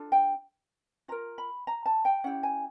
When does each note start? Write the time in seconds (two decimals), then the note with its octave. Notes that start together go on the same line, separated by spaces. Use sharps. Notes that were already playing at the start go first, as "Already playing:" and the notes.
Already playing: D4 F4 A4
0.12 G5
1.08 F4 A#4 A#5
1.38 B5
1.67 A#5
1.86 A5
2.05 G5
2.24 C#4 E4 G4 F#5
2.43 G#5